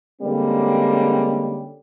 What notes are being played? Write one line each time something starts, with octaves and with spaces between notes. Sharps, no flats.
D3 G3 G#3 A#3 C4 C#4